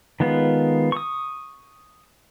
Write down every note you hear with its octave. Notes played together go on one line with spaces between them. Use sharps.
D#3 G#3 B3 F4
C#6 D#6